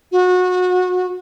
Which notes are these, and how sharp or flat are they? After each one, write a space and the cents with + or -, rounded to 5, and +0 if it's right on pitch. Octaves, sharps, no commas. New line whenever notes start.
F#4 -25